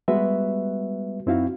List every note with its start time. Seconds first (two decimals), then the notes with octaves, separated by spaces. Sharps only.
0.08 G3 G#3 B3 F#4 B4 E5
1.26 F#2 C4 D#4 E4 F#4 F5